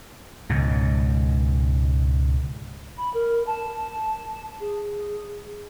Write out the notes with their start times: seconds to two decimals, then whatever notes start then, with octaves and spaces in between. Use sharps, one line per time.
0.49 C#2 G#2 B2
2.97 B5
3.14 A#4
3.47 A5
4.60 G#4